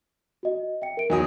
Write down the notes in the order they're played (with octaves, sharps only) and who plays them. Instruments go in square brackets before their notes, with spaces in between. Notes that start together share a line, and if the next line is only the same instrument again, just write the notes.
[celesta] F#4 D#5
E5 G5 C#7
A#4 D7
[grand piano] E2 F#3 D#6 [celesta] D#4 F#4 D#5